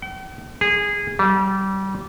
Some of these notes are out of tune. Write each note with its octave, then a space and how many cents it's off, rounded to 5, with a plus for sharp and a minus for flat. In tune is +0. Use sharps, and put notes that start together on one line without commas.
G5 -45
G#4 -20
G3 -25